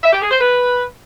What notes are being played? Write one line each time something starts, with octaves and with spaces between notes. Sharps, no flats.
E5
G4
G#4
C5
B4